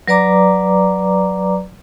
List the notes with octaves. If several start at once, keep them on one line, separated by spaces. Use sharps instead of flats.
F#3 B4 D5 A#5 D6